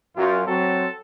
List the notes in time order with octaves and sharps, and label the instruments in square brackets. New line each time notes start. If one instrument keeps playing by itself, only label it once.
[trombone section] F#2 [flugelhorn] F4
[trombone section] F#3 C4 [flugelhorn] A4